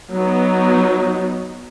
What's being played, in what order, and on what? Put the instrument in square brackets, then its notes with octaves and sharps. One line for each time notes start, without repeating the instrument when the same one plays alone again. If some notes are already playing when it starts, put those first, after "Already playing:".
[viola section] F#3 B3 D#4